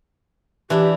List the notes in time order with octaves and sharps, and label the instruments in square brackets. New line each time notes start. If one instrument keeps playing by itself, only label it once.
[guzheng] E3 D4 E4 [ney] G4